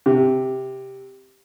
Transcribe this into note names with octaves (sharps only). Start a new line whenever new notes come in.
C3